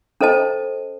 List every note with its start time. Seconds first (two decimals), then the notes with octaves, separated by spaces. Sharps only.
0.21 C#4 A4 C5 D#5 A5